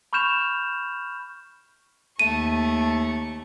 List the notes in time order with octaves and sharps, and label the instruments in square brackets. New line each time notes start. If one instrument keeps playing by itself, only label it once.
[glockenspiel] B5 C#6 F6 G6 E7 F7
[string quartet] D#2 A3 C#6 [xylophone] D#7